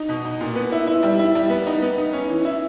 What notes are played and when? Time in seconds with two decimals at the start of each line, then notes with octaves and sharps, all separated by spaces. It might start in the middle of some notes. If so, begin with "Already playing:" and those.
Already playing: D#4
0.09 B2
0.25 D#4
0.41 A#2
0.55 B3
0.72 E4
0.87 E4
1.03 G3
1.19 E4
1.35 G3
1.50 B3
1.67 D#4
1.82 B3
1.98 D#4
2.13 C#4
2.30 E3
2.45 E4